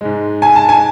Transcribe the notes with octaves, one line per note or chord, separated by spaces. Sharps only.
G#2 G#3
G#5
A5
G#5